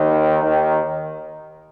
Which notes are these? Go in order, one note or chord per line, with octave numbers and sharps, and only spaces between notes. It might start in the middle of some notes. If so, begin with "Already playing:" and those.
Already playing: D#2 D#3
D#2 D#3